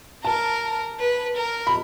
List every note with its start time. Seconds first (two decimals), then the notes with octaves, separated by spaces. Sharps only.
0.24 A#4 A5
1.00 B4
1.37 A#4
1.67 B5